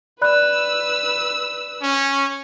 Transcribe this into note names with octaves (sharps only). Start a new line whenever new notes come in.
B4 D5 B5 E6 F#6
C#4